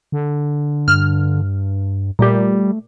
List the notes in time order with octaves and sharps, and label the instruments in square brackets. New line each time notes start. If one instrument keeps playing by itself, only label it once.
[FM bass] D3
[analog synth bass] G2 [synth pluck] F6
[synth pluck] A#2 G4 [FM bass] G3 [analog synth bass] A3